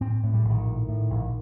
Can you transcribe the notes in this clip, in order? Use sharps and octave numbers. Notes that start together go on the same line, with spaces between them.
A2 C4
A2
G3
A#1
D#3
A2
A2
A#1